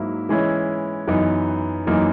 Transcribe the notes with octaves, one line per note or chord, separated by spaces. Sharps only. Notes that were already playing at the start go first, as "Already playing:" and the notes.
Already playing: G#2 F#3 A#3 E4
E3 G#3 C#4 E4
F#2 E3 B3 D#4
F#2 E3 A#3 D#4